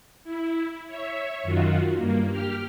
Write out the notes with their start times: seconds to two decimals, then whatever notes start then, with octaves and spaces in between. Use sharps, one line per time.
0.24 E4
0.86 C#5 E5
1.43 F#2 D#3 F4 F#4
1.95 G2 A#3
2.29 G4 F6